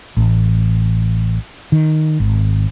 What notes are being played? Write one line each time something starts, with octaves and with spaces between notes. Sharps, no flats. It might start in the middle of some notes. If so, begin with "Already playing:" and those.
A1
D#3
G#1